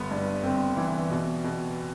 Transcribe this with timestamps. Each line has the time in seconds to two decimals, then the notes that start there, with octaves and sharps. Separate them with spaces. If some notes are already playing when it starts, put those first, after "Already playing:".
Already playing: G1 B3
0.11 G2
0.44 G1 C4
0.77 E3
1.10 B2
1.44 B2